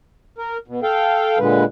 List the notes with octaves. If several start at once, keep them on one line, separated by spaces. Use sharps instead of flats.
A#4
B2
A4 F5 G5
A#2 D3 G#3 B4